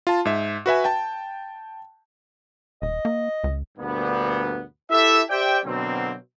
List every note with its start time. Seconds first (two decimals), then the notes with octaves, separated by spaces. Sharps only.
0.07 F4 A5
0.25 G#2 E5
0.66 F#4 B4 E5 G#5
0.84 G5 A5
2.82 D#1 D#5
3.05 A#3
3.44 C#2
3.78 D2 G2 A#2 B3
4.90 E4 G4 A4 E5
5.29 G4 C5 D5 E5 G5
5.65 B2 D3 F#3 A#3 C4